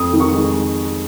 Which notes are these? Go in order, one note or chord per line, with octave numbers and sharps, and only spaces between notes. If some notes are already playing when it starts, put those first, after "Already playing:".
Already playing: F2 D#6
D#3
C#6
G#3